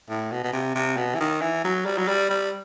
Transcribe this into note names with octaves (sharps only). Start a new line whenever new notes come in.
A2
B2
B2
C3
C3
B2
E3
D#3
E3
F#3
G3
F#3
G3
G3